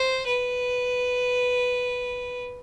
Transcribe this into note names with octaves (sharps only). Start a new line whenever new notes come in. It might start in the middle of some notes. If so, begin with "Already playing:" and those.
Already playing: C5
B4